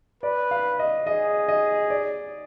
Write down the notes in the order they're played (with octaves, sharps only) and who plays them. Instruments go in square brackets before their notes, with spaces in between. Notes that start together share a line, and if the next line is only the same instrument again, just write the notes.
[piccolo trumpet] B4 [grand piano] D5
[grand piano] F5
D#5
[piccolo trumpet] G#4 [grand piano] D#5
[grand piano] D#5
D5